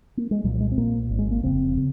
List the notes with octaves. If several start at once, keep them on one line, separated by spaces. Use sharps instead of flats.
A#3
G#3
C2 A#2 F#3
F#3
G#3
C4
A#1 A#2 A#3
G#1 G#2
G#3
A#3
F1 F2 C#3 C4
C#3